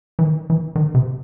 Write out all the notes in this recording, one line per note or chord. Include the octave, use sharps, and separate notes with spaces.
E3
D#3
E3
D#3
C3